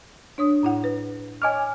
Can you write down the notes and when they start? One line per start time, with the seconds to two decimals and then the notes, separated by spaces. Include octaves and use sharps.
0.38 D4 C#5 D#6
0.63 A2 E4 F#5
0.84 B4
1.42 C#5 D#5 G#5 C#6 D6 F6